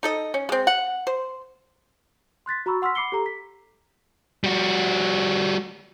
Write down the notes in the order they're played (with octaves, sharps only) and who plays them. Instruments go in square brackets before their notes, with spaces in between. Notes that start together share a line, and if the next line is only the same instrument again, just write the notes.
[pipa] D#4 A4 D#5
C#4
G#3 C4
F#5
C5
[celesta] C6 F#6 A6 B6
F#4 A#5 B5 C#6 E6
F#5 C6 E6 F6 B6
B5 D6 C7 C#7 G7
G4 A4 A#5
B6
[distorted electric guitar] G3 F#4